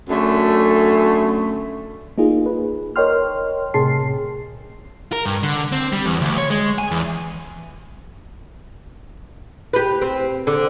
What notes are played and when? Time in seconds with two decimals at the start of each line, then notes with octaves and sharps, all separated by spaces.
0.09 F#2 D3 A3
2.18 A#3 D#4 F4 G#4
2.46 B4
2.96 A#4 C#5 D#5 G5 C6 F6
3.74 A2 C3 G#4 A5 C6 C7
5.12 A#4
5.26 G2
5.43 D3
5.72 C4
5.93 G3
6.06 E2
6.21 D2
6.38 C#5
6.50 G#3
6.78 G#5
6.91 E2
9.73 G4 B4
10.02 C4
10.47 D3